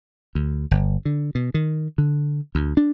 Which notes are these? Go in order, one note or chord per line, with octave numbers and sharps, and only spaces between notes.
D2
G1
D3
B2
D#3
D3
D2
D4